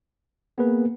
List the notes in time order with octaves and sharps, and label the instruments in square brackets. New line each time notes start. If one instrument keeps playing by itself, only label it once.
[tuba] A#3 [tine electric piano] B3 G#4 B4